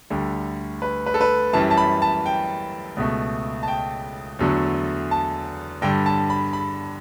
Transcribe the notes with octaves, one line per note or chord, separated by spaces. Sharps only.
D2 D3 G3
B4
B4
A4
B4
F#2 E3 G3 A5
A5
B5
A5
G5
C#2 B2 A3
A5
G5
E2 D3 F#3 A3
A5
G2 D3 G3 G5
A5
B5
B5